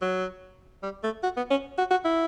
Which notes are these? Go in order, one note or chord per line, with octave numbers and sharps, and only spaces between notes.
F#3
G3
A3
F#4
B3
C#4
F#4
F#4
E4